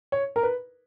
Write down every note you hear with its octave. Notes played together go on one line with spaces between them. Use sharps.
C#5
A#4
B4